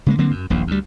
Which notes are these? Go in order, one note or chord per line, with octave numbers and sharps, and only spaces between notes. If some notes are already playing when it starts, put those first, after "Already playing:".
C#3 G#3 A#3
D3 F#3 A#3 C4
F#2
D#1 A#1 D#2
D2 G3